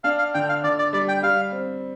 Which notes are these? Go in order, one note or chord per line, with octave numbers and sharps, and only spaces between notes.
D4 F5
F5
D3 G5
F5
D3 D5
D5
G3 D5
G5
G3 F5
C4